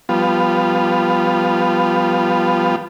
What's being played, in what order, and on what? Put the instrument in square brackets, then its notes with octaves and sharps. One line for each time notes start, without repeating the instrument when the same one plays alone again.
[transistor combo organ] F3 G3 B3 F4